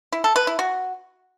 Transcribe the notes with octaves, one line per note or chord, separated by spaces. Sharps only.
E4
A4
B4
E4
F#4